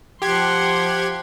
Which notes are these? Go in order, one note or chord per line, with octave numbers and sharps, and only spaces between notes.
F3 G4 F#5 C6 G#6